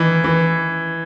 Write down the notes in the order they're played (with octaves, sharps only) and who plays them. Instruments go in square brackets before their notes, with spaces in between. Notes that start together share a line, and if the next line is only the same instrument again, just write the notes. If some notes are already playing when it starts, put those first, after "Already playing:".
Already playing: [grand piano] D#3 E3
E3